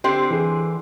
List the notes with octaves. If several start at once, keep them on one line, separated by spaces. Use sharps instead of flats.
D3 C4 G4 C5
E3 G#4